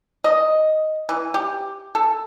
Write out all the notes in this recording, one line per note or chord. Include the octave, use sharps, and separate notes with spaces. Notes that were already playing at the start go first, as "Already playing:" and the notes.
D#5
E3
G4
A4